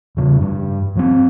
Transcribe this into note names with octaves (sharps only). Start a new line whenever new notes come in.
E2 C#3
G2
G2 F#3 C4